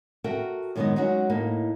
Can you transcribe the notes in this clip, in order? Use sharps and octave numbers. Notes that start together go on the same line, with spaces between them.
F#4 A4 A#4 E5 G5
F#2 D#3 G3 G#3 B3 D#4
F#3 G#3 C#4 D#4 F#4
A2 A#3 D#4